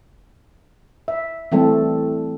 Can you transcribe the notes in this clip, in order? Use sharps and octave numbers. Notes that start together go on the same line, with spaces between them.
E5
E3 G3 A3 C4 A4